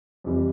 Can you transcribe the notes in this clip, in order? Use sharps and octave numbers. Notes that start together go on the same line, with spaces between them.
F2 C3 E3 G3